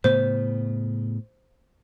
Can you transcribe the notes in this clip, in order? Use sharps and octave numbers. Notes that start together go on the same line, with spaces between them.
A2 C#3 B3 C5